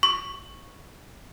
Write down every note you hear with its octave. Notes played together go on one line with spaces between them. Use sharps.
C#6